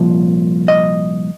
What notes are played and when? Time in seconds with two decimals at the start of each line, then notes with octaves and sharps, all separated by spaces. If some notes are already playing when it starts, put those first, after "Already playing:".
Already playing: C2 A#2 F3
0.68 D#5